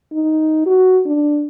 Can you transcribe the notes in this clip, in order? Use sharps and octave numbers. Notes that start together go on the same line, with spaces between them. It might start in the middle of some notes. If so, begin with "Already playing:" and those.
D#4
F#4
D4